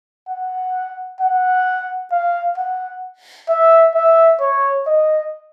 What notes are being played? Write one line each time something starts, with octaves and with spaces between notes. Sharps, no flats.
F#5
F#5
F5
F#5
E5
E5
C#5
D#5